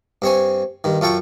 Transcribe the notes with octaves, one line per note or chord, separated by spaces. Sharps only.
G2 C4 C#5 G#5
G2 D#3
F#2 F4 A4 G5 C#6